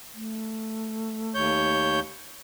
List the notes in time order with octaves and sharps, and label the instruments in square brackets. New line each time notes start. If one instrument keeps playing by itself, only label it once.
[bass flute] A3
[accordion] D#2 C#5 G6